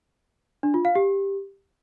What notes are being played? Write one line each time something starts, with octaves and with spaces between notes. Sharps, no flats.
D4
F4
F5
G4